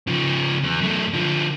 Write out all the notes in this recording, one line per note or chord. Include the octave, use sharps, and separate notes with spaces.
C#3 F3
E2
F#2 A3
D3 F3